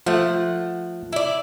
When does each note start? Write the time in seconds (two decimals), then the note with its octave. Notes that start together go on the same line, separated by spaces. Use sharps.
0.06 F3 A3 F#5
1.13 E4 D5